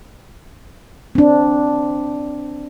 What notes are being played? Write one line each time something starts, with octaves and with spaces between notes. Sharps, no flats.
C4 D4